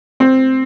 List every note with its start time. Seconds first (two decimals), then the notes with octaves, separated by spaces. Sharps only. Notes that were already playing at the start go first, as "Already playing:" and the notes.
0.20 C4